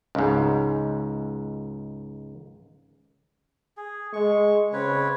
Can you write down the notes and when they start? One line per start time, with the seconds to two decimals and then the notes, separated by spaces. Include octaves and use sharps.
0.15 C#2 G#2
3.77 G#4
4.13 G#3 C#6
4.73 C#3 C4 B4 C#5